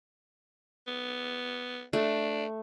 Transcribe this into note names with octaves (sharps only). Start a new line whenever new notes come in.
B3
A3 D4